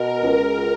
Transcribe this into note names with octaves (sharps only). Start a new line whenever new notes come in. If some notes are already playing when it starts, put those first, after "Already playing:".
Already playing: B2 A#4
C#2